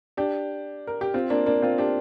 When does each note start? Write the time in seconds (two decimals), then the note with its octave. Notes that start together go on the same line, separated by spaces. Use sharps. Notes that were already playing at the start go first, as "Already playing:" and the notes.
0.17 D4 G4
0.87 A#4
1.01 G4
1.14 C4 F4
1.30 A#3 D4
1.46 A#3 D4
1.62 C4 F4
1.78 D4 G4